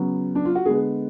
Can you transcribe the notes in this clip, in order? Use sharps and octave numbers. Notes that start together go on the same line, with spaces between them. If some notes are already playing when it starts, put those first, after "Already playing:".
Already playing: C#3 F#3 B3
D4
F4
F#4
D3 G#3 B3 G#4